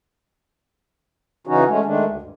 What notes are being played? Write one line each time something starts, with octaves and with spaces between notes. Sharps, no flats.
C#3 E3 C#4 D#4 F#4
G#3 A3 C#4
D#3 G#3 A3 D4
D2
G2